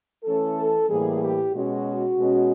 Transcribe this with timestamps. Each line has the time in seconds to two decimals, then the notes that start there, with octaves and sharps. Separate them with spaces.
0.24 E3 A3 C#4 A4
0.89 A2 E3 G3 A#3 G#4
1.22 G4
1.54 B2 G#3 C#4 F#4
2.17 B2 G#3 C#4